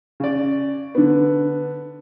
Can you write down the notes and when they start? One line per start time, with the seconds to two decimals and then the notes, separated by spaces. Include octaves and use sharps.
0.20 C#3 D5
0.95 D3 B3